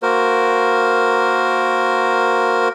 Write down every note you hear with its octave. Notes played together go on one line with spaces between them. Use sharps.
A#3 F#4 A#4 C5